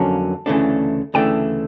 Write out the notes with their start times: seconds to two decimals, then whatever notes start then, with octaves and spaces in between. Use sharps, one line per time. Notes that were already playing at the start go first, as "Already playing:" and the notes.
Already playing: F2 D3 F#3 A#3 C#4 A5
0.46 D2 C#3 E3 A3 D4
1.14 D2 C#3 E3 A3 D4 G5